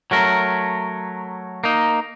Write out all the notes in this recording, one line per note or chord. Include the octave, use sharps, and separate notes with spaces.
F#3 A3 A#4
A#3 D#4